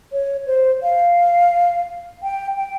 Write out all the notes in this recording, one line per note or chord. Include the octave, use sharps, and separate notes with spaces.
C#5
C5
F5
G5
G5